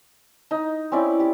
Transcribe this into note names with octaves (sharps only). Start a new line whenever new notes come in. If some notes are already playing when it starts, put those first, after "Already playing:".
D#4
C4 C#4 E4 D5
G4